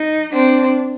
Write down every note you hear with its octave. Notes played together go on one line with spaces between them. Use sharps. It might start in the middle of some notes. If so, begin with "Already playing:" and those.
Already playing: D#4
C4 D4